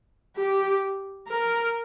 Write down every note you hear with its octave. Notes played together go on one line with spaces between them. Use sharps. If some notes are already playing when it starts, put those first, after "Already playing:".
G4
A#4